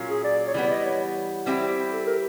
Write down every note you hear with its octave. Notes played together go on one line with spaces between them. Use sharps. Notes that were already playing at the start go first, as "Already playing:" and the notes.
Already playing: A#2 F#3 A#3 C#4 F4
G#4
D5
C#5
E3 G3 B3 D5
D#5
C#5
G3 C4 E4 G4
A4
A#4